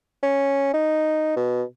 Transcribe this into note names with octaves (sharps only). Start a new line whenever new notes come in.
C#4
D#4
B2